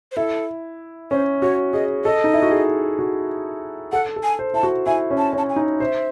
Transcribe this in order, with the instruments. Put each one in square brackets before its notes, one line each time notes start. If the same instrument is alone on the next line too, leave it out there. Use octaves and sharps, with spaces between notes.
[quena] C5
[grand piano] E4 [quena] A4
[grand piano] C#4 [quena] C5
[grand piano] F#4 [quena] C#5
[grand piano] G#4 [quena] D#5
[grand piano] A4 [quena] D#5
[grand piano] D#4
E4
F#4
G#4
F#4
[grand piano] A4 [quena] F#5
[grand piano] A4
[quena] G#5
[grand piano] C5
[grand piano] E4 [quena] A5
[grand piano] F#4
[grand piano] E4 [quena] G#5
[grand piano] C#4
[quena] A5
[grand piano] C#4
[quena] A5
G#5
[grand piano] D#4
[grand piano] C5 [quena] E5